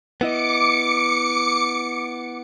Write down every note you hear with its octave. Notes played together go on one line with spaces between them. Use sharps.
B3 E4 D#5 D6 C#7